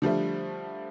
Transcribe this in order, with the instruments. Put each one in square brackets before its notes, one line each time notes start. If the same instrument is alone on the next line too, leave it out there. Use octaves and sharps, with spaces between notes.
[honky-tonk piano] D3 F3 G3 A3